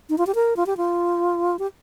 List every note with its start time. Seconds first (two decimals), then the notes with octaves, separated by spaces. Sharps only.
0.09 D#4
0.18 F4
0.27 G4
0.35 A#4
0.57 F4
0.66 G4
0.77 F4
1.59 G4